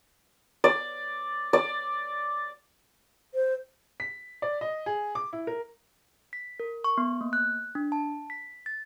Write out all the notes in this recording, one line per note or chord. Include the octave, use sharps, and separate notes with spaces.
D5
D5
C5
B6
D5
D#5
G#4
D6
E4
A#4
B6
A#4
C#6
B3
A#3
F#6
D4
A5
B6
A6